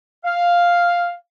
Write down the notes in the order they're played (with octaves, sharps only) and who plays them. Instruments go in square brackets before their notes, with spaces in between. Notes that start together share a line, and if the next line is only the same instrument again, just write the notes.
[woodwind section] F5